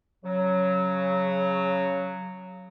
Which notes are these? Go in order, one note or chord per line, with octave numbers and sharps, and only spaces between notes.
C#3 F#3